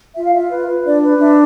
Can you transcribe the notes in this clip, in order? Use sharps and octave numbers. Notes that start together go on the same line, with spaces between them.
F4 E5
F5
F4 E5
B4
B4
D4 D5
B4
D4 E5